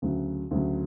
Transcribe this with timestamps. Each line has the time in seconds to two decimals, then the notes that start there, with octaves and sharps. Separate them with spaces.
0.02 D2 C#3 F#3
0.51 D2 C#3 F#3